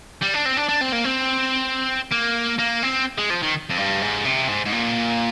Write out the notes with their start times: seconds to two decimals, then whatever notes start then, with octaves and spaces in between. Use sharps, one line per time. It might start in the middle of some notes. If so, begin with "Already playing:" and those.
0.22 G3
0.34 D4
0.45 C4
0.57 D4
0.69 D4
0.81 C4
0.93 A#3
1.05 C4
2.12 A#3
2.59 A#3
2.83 C4
3.18 G#3
3.30 F3
3.42 D#3
3.69 F2
3.77 G2
4.02 G#2
4.25 C3
4.48 G#2
4.66 G#2
4.73 A#2